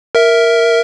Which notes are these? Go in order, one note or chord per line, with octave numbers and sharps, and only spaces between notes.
A#4 E5